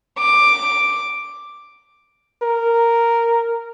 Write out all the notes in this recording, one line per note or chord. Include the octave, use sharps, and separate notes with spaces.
D6
A#4